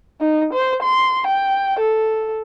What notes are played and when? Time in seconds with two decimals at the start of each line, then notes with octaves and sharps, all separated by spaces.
0.21 D#4
0.54 C5
0.83 C6
1.28 G5
1.80 A4